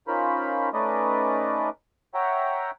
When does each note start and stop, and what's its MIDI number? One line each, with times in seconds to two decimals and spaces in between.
0.08 0.69 61
0.08 0.69 63
0.08 0.69 65
0.08 0.69 70
0.08 0.69 72
0.08 0.69 83
0.73 1.69 57
0.73 1.69 61
0.73 1.69 63
0.73 1.69 71
0.73 1.69 74
0.73 1.69 75
2.14 2.71 73
2.14 2.71 76
2.14 2.71 78
2.14 2.71 79
2.14 2.71 82